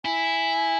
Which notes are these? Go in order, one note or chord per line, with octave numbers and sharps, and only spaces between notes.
E4 G#5